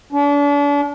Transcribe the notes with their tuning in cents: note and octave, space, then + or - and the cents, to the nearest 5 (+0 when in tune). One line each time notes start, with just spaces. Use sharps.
D4 -40